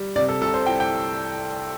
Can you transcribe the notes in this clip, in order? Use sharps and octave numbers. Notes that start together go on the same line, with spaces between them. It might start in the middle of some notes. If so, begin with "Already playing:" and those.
Already playing: G3
C3 D5
A4
C2 A4
C5
E4 G5
G5